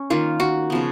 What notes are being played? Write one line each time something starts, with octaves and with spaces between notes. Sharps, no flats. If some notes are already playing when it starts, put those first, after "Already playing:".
Already playing: C#4
D#3 A#3 F4
F#4
C#3 F3 B3